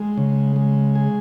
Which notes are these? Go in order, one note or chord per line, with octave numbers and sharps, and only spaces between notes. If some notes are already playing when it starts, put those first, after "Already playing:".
Already playing: G#3
C#3
G#3
G#4